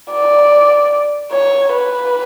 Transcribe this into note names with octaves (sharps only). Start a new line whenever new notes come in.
D5
C#5
B4